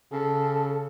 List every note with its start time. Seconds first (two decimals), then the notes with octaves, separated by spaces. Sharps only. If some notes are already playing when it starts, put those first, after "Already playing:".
0.12 C#3 A4